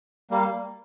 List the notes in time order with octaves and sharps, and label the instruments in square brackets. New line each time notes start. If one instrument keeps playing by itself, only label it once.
[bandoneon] G3 A#3